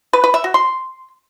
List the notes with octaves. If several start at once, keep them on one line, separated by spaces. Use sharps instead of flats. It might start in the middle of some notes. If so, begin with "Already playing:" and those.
B4
B4
E5
F#4
C6